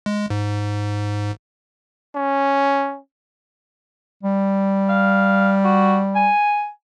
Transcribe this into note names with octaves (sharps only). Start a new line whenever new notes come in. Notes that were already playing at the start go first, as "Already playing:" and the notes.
G#3
G#2
C#4
G3
F5
F#4
G#5